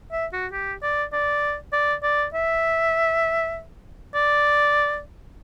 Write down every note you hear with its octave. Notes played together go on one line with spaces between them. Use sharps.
E5
F#4
G4
D5
D5
D5
D5
E5
D5